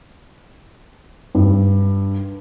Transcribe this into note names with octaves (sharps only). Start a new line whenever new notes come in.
G2